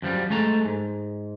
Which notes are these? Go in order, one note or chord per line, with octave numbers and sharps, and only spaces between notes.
F#2 F3 G3
G#3 A3 A5 A#5
G#2